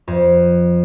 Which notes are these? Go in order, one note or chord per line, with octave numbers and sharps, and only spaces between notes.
F2